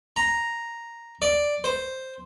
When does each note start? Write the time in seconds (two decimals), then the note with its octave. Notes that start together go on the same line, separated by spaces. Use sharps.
0.16 A#5
1.22 D5
1.64 C5